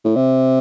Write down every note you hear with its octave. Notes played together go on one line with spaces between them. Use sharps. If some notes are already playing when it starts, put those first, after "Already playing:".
A2
C3